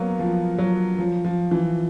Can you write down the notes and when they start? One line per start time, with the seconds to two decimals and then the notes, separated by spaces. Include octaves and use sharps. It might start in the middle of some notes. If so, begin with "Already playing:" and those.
Already playing: F#3 A#3 B3
0.19 F3
0.58 F#3
0.99 F3
1.25 F3
1.51 E3